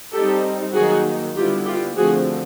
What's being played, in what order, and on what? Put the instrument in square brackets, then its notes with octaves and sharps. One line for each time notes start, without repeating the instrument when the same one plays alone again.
[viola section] G3 C4 D#4 G4 A4
D#3 F#3 A#3 D#4 F#4 G#4
D3 G3 B3 E4 F4 G4
F4 G4
D3 F3 A3 C4 F#4 G#4